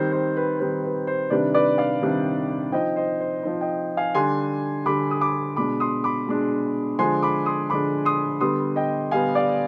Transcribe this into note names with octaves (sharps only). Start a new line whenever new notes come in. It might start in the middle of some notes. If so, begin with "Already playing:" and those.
Already playing: D#3 G3 C4 C5
C5
B4
D#3 G3 C4 B4
B4
C5
C3 D#3 G3 D4 B4 D5
B4 D5
D5 F5
C3 D#3 G3 D4
F3 C4 D#4 D#5 G5
C5 D#5
C5
F3 C4 D#4
D#5 G5
F5 G#5
D3 G3 D4 G#5 C6
D3 G3 D4 B5 D6
D#6
B5 D6
B2 G#3 D4 B5 D6
C6 D#6
B5 D6
B2 G#3 D4
D3 F3 G#3 D4 G#5 C6
B5 D6
C6 D#6
D3 F3 G#3 D4 B5 D6
C6 D#6
D3 G3 B3 C6 D#6
D#5 G5
D3 G3 B3 F5 G#5
D5 F5